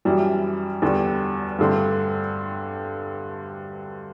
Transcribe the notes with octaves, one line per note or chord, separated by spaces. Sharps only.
F#2 E3 G3
E2 D3 G3
G2 D3 A3 C4